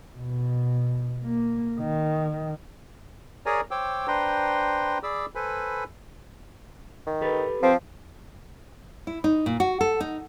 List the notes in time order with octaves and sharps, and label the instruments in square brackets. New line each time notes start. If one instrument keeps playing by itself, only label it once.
[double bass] B2
A#3
D#3
[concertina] G#4 A#4 C#5 D5 G#5 A#5
C5 C#5 G5 D6 E6
D4 B4 C5 G5 A#5 C6
G#4 D5 B5 D6 E6
A4 B4 C5 G#5 B5
[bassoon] D#3
[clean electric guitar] G4 A4 B4
[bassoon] F3 [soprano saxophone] C4
[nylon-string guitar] E4
D#4
A#2
F#4
A4
D#4